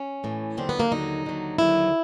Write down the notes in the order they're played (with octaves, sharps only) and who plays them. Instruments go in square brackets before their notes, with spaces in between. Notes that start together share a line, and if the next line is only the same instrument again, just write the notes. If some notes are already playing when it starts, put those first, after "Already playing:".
Already playing: [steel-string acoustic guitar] C#4
A2 E3
D#2 D3 F#3 C4
B3
A#3
D#2 D3 F#3 D#4
D#2 D3 F#3
D#2 D3 F#3 E4